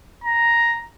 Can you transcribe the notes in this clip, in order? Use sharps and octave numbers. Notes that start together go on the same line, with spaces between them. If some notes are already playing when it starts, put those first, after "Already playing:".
A#5